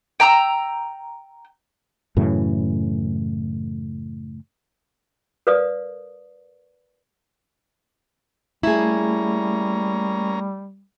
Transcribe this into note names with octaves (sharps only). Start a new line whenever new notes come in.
G5 A#5 E6
F#2 A2 C#3 E3
A#4 B4 D5 F5 D#6
G3 A3 A#3 C#4 E4 G#4 A#5